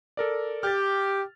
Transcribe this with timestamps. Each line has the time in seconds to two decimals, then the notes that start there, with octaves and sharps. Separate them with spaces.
0.17 A4 A#4 D5
0.63 G4 F6 A6